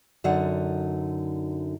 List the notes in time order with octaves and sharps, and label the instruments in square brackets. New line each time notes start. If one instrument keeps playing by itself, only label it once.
[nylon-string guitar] F#2 D3 D#4 F#4 F#5